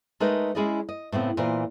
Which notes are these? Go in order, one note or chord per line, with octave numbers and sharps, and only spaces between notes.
G#3 A3 D#4 A#4 B4
G#3 C#4 E4 G#4 D5 D#5
D#5
A2 C#3 B3 C4
A#2 E3 A#4 C5